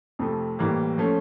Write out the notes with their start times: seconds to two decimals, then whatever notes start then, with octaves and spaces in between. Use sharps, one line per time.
0.19 F2 C3 F3 A3
0.59 A2 E3 G3 A#3
0.98 F3 A3 C#4